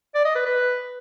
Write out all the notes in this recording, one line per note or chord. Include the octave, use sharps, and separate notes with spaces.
D5
D#5
B4
B4